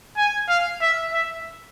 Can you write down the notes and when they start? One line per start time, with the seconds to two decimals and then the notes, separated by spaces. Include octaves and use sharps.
0.17 G#5
0.48 F5
0.81 E5
1.13 E5